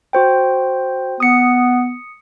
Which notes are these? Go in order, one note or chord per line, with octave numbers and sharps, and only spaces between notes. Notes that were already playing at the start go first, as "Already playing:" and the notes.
F#4 C5 G5
B3 D#6 C#7